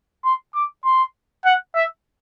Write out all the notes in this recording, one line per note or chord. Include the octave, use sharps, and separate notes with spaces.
C6
D6
C6
F#5
E5